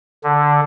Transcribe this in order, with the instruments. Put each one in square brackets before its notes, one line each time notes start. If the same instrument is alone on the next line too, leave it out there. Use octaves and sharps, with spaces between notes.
[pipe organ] D3